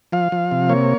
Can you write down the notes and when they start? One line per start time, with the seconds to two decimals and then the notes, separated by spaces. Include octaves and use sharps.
0.12 F3 F5
0.32 F3
0.52 C3
0.69 A#3 C#5